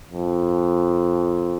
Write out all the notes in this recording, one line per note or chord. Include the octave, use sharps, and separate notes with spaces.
F2